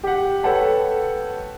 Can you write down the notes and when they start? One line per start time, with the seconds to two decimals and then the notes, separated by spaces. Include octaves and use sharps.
0.04 G4 F#5
0.43 A4 B4 C#5 F#5 G5 A5